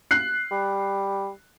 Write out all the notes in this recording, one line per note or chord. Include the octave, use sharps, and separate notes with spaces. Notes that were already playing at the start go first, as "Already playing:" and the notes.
F#6 C7
G3